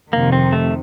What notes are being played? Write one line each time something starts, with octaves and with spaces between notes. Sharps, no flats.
F2 C3 D#3 A#3
C4
A3